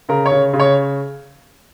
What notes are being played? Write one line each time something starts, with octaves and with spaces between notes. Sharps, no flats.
C#3 A#4
C#5
C#3
C#3
C#5